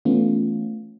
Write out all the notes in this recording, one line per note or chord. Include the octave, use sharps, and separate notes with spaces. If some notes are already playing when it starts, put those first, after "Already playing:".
E3 A3 B3 C#4 F4